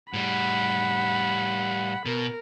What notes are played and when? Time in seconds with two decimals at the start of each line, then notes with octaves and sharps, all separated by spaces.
0.14 A2 G3 F#5 B5
2.06 B2 A#4